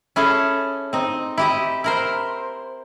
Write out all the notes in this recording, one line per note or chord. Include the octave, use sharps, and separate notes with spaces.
C#4 E4 G#4 A4
C4 D#4
E4 G4 D#5
E4 A#4 C5